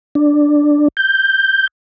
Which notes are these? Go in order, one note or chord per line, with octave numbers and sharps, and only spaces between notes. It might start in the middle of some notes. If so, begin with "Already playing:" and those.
D4
G6